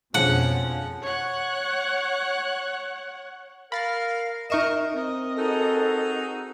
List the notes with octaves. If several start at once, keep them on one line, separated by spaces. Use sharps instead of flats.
F2 B2 D3 F3 G#3 C#4 F#5
C#5 F#5
A#4 F5 B5 A6
D#4 A#4 D#5 E5 C#6 E7
C4 A#4 D#5
D#4 F#4 G#4 A4